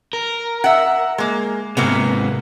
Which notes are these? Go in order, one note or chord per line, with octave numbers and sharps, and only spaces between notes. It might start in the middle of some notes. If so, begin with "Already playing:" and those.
A#4
E5 F#5
G#3 A#3
G#2 C3 F#3 A#3 B3